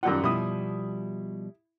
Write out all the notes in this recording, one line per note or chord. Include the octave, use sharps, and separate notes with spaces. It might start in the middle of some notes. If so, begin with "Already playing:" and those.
F#2 D#3 G3 F4 F#5
B2 F3 G3 E4 D#6